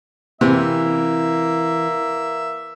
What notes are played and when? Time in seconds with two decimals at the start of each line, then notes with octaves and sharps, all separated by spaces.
0.41 C3 E3 A#3 E5